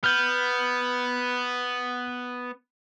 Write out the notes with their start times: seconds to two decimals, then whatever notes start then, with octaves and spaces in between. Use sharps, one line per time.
0.04 B3 F6 G6